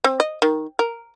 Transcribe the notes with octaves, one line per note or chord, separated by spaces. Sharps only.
C4
D#5
D#3
A#4